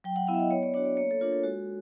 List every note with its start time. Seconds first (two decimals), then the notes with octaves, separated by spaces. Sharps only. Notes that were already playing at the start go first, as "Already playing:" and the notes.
0.04 F#3 G5
0.16 F#5
0.27 B3 E4 F5
0.34 E5
0.39 D#5
0.50 B3 C#5
0.63 D5
0.74 D4 F#4 C#5
0.85 D5
0.97 A#3 C#5
1.11 A4
1.21 D4 F4 A#4
1.32 A4
1.43 G#3 F#4